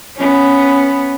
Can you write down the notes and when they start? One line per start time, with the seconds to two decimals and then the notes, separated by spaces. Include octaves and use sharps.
0.16 B3 C#4